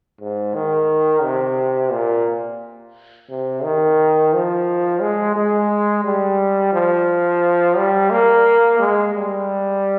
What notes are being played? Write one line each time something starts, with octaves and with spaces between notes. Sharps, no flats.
G#2
D#3
C3
A#2
C3
D#3
F3
G#3
G#3
G3
F3
G3
A#3
G#3
G3